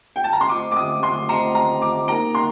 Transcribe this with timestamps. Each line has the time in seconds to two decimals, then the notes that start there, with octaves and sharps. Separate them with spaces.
0.16 G5
0.24 A5
0.33 A#5
0.41 C6
0.49 A3 C4 F4 C5 D#5 D6
0.72 D6
0.76 D#6
1.03 C6
1.29 A3 C4 F4 C5 D#5 A#5
1.55 A#5
1.82 D6
2.08 A#3 D#4 A#4 A#5
2.35 C6